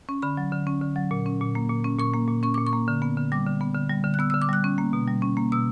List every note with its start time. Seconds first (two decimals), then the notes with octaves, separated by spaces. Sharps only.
0.09 C#4
0.22 D3 B5
0.37 F#3
0.52 D3
0.67 C#4
0.81 D3
0.96 F#3
1.11 A#2
1.26 C#4
1.41 A#2
1.55 A#3
1.70 A#2
1.84 C#4
1.99 A#2 C#6
2.14 A#3
2.28 A#2
2.43 C#4 C#6
2.54 A#2 D6
2.67 C#6
2.73 A#3
2.88 D3
3.02 B3
3.17 D3
3.32 G3 D6
3.47 D3
3.61 B3
3.75 D3
3.90 G3
4.04 D3
4.14 F#6
4.19 B3 E6
4.30 E6
4.34 D3
4.42 D6
4.49 G3 F#6
4.64 C#4
4.78 A#3
4.93 B2
5.08 G3
5.22 C#4
5.37 A#3
5.52 B2 E6